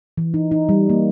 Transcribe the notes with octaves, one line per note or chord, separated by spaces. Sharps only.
E3
D#4
D#4
G3
A#3